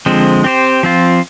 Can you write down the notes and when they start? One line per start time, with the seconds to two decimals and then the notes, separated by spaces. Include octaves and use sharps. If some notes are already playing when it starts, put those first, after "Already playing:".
0.06 D3 F3 G#3 C4
0.44 C4 G4 C5
0.83 F3 C4 F4